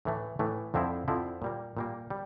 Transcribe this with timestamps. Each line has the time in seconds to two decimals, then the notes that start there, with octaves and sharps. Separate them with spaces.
0.05 A2 E3 A3
0.39 A2 E3 A3
0.74 F2 D3 F3 C4 E4
1.08 F2 D3 F3 C4 E4
1.42 A#2 G3 A#3
1.77 A#2 G3 A#3
2.10 G3